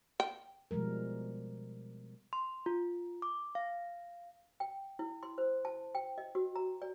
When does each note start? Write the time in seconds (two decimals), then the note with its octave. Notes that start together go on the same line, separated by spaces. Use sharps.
0.20 G5
0.71 B2 F3 G3 G#3 A#4
2.33 C6
2.66 F4
3.22 D6
3.55 F5
4.60 G5
4.99 E4
5.23 C6
5.38 C5
5.65 A5
5.95 G5
6.18 D#5
6.35 F#4
6.56 A#5
6.82 D5